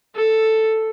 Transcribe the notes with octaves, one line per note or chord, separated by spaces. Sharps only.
A4